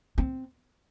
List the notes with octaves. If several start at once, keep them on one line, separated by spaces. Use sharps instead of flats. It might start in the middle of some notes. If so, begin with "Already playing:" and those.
C4